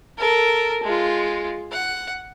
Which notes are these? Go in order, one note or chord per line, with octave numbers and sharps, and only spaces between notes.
A4 A#4
G#3 F4
F#5